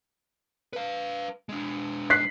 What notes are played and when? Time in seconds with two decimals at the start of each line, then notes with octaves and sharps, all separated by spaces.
0.73 B4 F5
1.49 G#3 D4
2.10 F#6 B6 C7